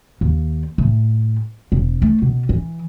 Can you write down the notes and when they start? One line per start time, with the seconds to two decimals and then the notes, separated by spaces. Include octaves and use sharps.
0.21 D#2
0.78 A2
1.72 E1
2.02 A3
2.22 B2
2.49 E3